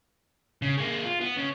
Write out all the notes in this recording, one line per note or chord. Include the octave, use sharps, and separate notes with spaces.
C#3
G#3 A#3
F4
B3
C#3